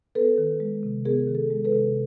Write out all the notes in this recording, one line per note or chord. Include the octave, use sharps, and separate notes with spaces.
B3 A4 B4
D#3
G#3
C3
B3 G#4 A#4
D#3
A4
G#3
A4 B4
C3